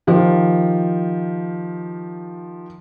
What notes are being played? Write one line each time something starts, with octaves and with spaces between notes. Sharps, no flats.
D#3 F3 F4 G4